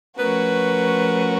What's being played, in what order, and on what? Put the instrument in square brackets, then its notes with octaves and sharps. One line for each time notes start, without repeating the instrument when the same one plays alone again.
[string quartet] F3 A3 C#4 F#4 A#4 [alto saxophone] B4